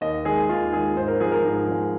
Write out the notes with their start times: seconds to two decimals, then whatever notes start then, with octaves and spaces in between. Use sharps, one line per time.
0.01 D#2 D#5
0.25 D#3 G#3 G#4
0.49 D#2 F4
0.72 D#3 G#3 G#4
0.96 G#2 C5
1.08 A#4
1.20 F3 G#3 G#4
1.32 A#4
1.44 G#2
1.68 F3 G#3